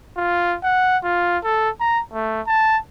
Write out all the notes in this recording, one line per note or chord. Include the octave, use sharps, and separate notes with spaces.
F4
F#5
F4
A4
A#5
A3
A5